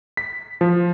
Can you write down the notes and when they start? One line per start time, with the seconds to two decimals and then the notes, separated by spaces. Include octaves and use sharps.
0.17 B6
0.61 F3